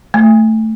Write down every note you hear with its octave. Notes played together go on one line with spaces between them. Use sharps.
A3